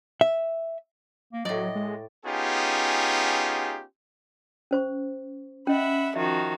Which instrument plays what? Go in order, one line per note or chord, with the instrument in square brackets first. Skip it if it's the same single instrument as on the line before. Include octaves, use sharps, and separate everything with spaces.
[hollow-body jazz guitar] E5
[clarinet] A#3
[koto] A2 D5 [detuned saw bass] F#3 [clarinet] D#5
[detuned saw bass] G#3
[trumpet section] B3 C#4 D#4 F4 G4 G#4
[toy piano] C#4 C5 C#6
[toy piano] C#4 D#5 [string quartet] E5 F#5 B5
[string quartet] D#3 F3 F#4 [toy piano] E5